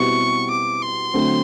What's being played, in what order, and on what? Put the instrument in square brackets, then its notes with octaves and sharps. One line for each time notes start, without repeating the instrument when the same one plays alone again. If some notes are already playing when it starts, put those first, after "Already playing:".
Already playing: [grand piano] B2 G3 C4 E4 G4 [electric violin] C#6
[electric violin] D6
C6
[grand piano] D3 F#3 A3 C4